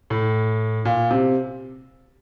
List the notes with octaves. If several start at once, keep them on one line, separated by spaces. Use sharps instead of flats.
A2
A#2
C3